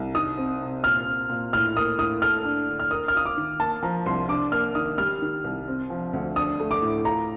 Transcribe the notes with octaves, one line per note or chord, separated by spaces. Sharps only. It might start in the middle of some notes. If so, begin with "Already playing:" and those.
Already playing: C2
D#4 D#6
C4
C3
A#2 F6
C4
A#2
A2 F6
A#3 D#6
A2 D#6
A4 F6
D4
D3
F6
A#4 D#6
F6
F4 D#6
D6
D#3
A#3 A5
F3 A#5
C2 C6
D4 D6
A#3 F6
D#3 D#6
G3 F6
D#3
C2
C4
F3
D2
D4 D#6
A3
D6
A2
F4 A#5